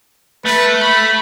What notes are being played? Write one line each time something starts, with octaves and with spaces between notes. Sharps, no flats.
A3 B4
B5